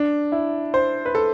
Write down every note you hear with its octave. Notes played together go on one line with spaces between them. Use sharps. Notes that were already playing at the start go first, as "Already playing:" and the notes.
Already playing: D4
E4
C5
B4
A4